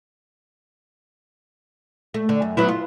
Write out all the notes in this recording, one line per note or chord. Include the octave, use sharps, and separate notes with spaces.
A3
D3
F#2
F#3 B3 E4
F4